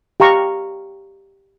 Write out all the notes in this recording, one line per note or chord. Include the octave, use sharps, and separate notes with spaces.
G4 F5 A#5 C#6